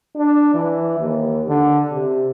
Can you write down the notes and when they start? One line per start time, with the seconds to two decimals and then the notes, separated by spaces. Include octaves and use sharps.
0.16 D4
0.54 E3
1.00 D#2
1.48 D3
1.91 C3